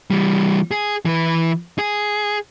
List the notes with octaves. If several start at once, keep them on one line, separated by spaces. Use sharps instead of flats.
E3 G3
G#4
E3 B4
G#4